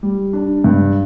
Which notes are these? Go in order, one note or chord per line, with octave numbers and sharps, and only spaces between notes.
G3
D4
G2